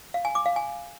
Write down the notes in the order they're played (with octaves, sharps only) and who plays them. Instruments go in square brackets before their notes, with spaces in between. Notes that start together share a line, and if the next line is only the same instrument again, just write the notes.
[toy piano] F5
G#5
D6
F5
G#5